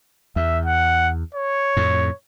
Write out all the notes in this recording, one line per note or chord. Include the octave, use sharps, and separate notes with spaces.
E2 E5
F#5
C#5
F2 A2